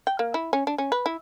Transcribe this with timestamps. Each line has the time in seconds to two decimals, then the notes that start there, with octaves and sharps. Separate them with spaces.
0.07 G5
0.19 A#3
0.34 E4
0.53 C#4
0.67 D4
0.78 C#4
0.92 B4
1.06 E4